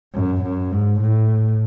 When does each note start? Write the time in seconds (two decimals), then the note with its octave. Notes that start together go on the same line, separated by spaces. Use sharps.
0.14 F#2
0.43 F#2
0.71 G#2
1.01 A2